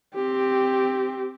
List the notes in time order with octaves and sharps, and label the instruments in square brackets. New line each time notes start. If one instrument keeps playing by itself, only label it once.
[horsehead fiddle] C4 G4